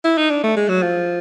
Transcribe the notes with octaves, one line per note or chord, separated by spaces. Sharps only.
E4
D#4
D4
A3
G#3
F#3
F3